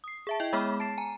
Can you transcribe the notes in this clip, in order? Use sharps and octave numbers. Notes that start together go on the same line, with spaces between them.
D#6 C7
G#4 E5 A5
E4 D#5 G5
G#3 B3 G#4 B5 D6 F6
A5 A6 C7 E7
G#5 A#5